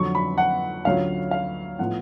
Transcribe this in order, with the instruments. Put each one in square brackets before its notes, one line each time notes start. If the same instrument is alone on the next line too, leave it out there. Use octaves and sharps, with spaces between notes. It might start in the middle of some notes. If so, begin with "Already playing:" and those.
Already playing: [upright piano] F2 D3 F#3 C#6
B5
F#5
D2 D3 F#3 C#4 F4 F5
F5
A2 F3 B3 F4 F#5